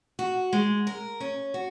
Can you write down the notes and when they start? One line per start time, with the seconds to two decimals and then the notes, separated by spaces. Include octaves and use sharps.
0.19 F#4
0.53 G#3
0.87 A#4
1.20 C#4
1.54 F#4